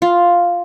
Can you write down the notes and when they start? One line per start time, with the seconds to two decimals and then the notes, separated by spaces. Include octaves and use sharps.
0.02 F4